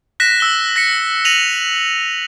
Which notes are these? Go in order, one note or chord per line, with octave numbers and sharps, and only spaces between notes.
F#6 A#6 B6 E7
E6 G7
A#6 B6 C#7
A#6 D#7 F7 F#7